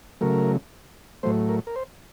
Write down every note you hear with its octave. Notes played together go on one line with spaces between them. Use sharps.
C#3 F#3 A3 A#4
A2 F#3 A3 C5
A#4
A#4
C5